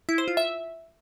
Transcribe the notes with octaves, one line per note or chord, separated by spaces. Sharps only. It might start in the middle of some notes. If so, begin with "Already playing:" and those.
E4
C5
F4
E5